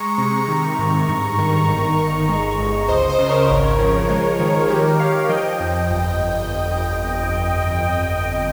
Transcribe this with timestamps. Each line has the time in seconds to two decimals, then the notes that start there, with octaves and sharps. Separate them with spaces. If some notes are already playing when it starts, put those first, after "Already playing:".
Already playing: G#3 A#5 C#6
0.18 C3 A#5 C#6
0.48 D#3 A#5 C#6
0.79 G#2
1.08 G2
1.38 D#3
1.68 G1
1.99 G1
2.29 G#3
2.59 G1
2.88 C#2 C5 D#5
3.08 C5 D#5
3.19 C#3
3.29 A#4 C#5
3.49 G#1
3.79 F3
4.10 G#3
4.40 D#3
4.69 D#3 G4 A#4
4.99 D#3 C#5 F5
5.29 F3 D#5 G5
5.60 F2
5.90 G1